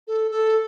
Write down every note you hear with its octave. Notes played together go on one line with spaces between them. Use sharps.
A4
A4